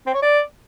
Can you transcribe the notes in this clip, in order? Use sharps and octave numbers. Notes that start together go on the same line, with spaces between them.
C4
C#5
D5